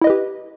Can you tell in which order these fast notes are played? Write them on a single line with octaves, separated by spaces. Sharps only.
E4 D#5 B4 G4